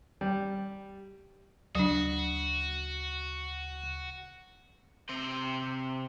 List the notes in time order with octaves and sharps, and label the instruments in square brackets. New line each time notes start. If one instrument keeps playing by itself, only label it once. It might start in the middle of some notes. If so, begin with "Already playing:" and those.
[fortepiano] G3
[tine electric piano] D2 C#3 [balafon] F#3 D4 [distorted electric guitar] F#4
[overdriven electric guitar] C3 C5